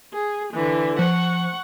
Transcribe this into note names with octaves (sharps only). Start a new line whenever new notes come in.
G#4
D3 E3
F3 F#5 C#6